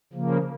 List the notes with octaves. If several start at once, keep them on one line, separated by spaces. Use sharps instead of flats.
C#3 F3 A#3